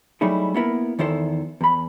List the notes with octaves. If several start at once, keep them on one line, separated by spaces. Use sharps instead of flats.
F#3 G3 A3 D#4 E4 G#4
A#3 B3 E4 A#4
E2 D#3 E4 A4 C5
E2 B5